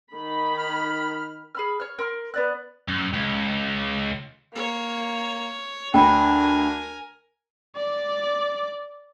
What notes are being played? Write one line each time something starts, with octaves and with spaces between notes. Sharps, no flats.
D#3 B5
F6
G#4 B5 F6
C#5 F6
A#4 C6 F6
B3 D5 F#6
F#2
C#2
A#3 C#5
D2 D4 A#4 G5 G#5 B5
D5 D6